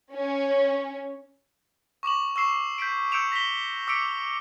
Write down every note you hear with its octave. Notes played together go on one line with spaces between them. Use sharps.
C#4
C#6 D6 E7 F#7
C#6 E6 C7 E7
G6 B6 C7 D7
E6 G6 C#7 D7 E7 F7
A#6 B6 F7 G7
D6 E6 B6 C#7 D7